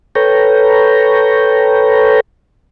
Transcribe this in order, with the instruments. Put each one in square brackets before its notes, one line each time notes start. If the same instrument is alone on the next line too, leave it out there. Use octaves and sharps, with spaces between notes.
[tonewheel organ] A4 B4 C#5 G5 A#5